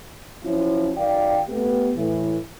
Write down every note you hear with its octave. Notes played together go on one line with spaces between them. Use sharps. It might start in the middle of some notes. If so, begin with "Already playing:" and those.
F3 F#3 C#4 E4 F4
F#2 D#3 D5 F5 G5
A3 B3 G4
A2 E3